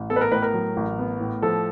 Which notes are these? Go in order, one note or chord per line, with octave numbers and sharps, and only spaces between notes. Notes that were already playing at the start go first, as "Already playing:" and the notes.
Already playing: A1
B3 A4
B4
A#4
A2 B4
A#4
F#3
A1
B3
A2
F3 A4